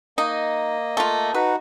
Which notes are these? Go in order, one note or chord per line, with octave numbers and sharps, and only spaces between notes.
A#3 D#4 D#5
A3 F4
D#4 F#4 B4